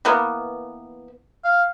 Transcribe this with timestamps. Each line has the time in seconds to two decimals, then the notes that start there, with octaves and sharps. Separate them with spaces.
0.05 E3 A#3 B3
1.44 F5